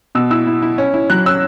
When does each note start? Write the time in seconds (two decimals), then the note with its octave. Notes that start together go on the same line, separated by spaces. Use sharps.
0.15 B2 E6
0.31 E4 E6
0.47 E4
0.62 E4
0.78 C#4
0.94 E4
1.10 F#3 F#6
1.26 C#4 E6